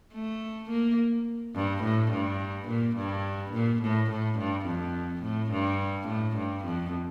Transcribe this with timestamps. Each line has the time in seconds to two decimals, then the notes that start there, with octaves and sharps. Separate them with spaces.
0.14 A3
0.70 A#3
1.55 G2
1.83 A2
2.12 G2
2.68 A#2
2.97 G2
3.53 A#2
3.82 A2
4.11 A2
4.38 G2
4.66 F2
5.23 A2
5.51 G2
6.08 A2
6.36 G2
6.65 F2